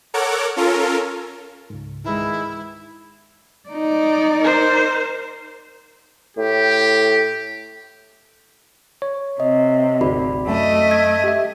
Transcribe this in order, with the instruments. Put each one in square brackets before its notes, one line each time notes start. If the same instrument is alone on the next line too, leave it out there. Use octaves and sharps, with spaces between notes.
[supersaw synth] A4 A#4 C#5 F#5 D6
C#4 F4 A4 A#4
[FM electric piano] C#2 G#2
[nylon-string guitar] D#3 E3 G#3 [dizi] E4
[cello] D#4 D5
[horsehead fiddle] A#4 C5
[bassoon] A2 [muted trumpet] G4
[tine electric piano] C#5
[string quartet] C3 [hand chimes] D#5
[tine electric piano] G1 D2 [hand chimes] F#4 D5 B5
[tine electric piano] F#2 [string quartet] A3 D#5
[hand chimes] G#6
[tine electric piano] G4 E5